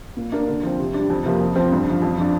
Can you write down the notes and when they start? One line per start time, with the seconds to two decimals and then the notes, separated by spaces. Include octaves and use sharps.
0.17 A#2
0.32 A#3 D4
0.48 D3
0.63 F3 C4
0.78 C3
0.94 G3 D4
1.10 F2
1.25 C3 F3 A#3
1.41 F2
1.56 F3 C4
1.72 G2
1.86 D3 F3
2.02 F2
2.18 F3 D4